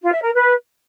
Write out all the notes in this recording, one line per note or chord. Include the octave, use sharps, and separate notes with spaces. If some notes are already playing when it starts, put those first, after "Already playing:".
F4
E5
A#4
B4